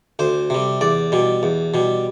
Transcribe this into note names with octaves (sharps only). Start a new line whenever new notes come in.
D2 C5
C3 G3
E2 D5
B2 G3
E2
B2 G3